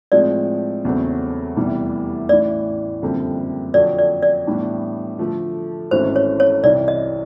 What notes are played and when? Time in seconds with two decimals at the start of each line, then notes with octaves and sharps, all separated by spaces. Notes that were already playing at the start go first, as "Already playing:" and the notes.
0.12 A2 F3 G#3 C4 D5
0.85 E2 C#3 F#3 A3 C4
1.57 F1 E2 C3 E3 G3
2.29 A1 A2 E3 D5
3.02 F#1 F2 D3 G3 C4
3.74 F2 D3 F#3 D5
3.99 D5
4.22 D5
4.47 A2 E3 G3 B3 D4
5.19 D3 F3 A3
5.91 G#1 G#2 E3 A3 C#4 C5
6.16 C#5
6.40 C#5
6.64 C2 C3 E3 D5
6.88 D#5